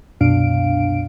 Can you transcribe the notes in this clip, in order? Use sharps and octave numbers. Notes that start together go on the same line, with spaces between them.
C2 F#2 B2 D4 F5 D7